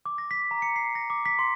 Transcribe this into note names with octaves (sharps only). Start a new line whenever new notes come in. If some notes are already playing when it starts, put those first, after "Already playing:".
D6
A#6
B6
A#5
C#7
C7
A#6
D6
B6
C6